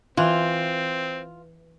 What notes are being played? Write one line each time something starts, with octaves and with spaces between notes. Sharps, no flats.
E3 C4 F4